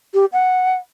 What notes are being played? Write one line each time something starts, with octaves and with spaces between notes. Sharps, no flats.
G4
F#5